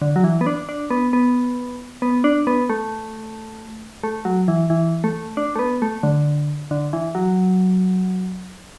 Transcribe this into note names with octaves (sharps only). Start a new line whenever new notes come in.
D3
F#3
E3
B3
D4
D4
B3
B3
B3
D4
B3
A3
A3
F#3
E3
E3
A3
D4
A3
B3
A3
D3
D3
E3
F#3